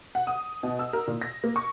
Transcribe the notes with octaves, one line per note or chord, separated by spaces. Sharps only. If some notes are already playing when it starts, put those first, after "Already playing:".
F#5
D#6
B2
E6
A#4
A#2
A#6
A#3
C#6